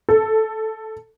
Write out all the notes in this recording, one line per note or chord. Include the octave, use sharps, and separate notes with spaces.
A4